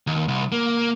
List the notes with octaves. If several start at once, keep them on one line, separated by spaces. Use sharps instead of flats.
D#2
C2
A#3